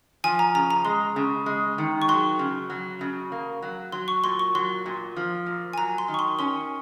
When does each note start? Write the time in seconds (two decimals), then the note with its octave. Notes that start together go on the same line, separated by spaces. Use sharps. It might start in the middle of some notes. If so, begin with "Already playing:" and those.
0.24 F3 G#5
0.39 A#5
0.55 C#3 A#5
0.70 A#5
0.85 G#3 C6
1.16 C#3
1.46 G#3
1.78 D#3
2.02 C#6
2.08 F#3 C6
2.39 C#3
2.70 F#3
3.01 C#3
3.32 A#3
3.62 F#3
3.92 F#3 C6
4.08 C#6
4.24 A#2 C6
4.39 C#6
4.55 F#3 C6
4.86 A#2
5.17 F3
5.46 A#2
5.73 G#5
5.78 F#3 A#5
5.98 C6
6.08 D#3
6.14 C#6
6.19 C6
6.39 C#4 C6